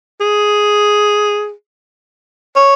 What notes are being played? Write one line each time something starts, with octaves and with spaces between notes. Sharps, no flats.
G#4
C#5